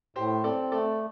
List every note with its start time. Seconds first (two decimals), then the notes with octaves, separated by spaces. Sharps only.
0.16 A2 G4 C5
0.44 C4 A4 D5
0.72 A3 A4 D5